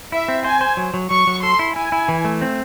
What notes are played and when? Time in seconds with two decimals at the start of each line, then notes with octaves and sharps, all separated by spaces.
0.12 E4 E5
0.28 C4
0.44 C5 G#5
0.61 C5
0.77 F#3
0.94 F#3
1.11 F#3 C#6
1.27 F#3
1.43 A4 C6
1.59 E4
1.75 E4 G#5
1.92 E4
2.08 E3
2.25 A3
2.41 C4